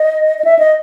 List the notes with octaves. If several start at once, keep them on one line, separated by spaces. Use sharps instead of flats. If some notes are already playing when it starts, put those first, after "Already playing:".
Already playing: D#5
D#5
E5
D#5